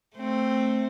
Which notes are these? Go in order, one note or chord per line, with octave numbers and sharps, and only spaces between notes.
A3 C4